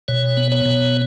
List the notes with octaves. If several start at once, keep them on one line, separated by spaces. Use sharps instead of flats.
B2 C#5
B3
C#5
B2